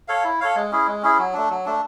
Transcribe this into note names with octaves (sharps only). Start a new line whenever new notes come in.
A4 C#5 F5
E4
A4 C#5 F5
G#3
C#4 E4 G#4
G#3
C#4 E4 G#4
F#3
A3 D4
F#3
A3 D4